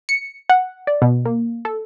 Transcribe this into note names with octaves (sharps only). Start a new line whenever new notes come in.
C#7
F#5
D5
B2
A#3
A4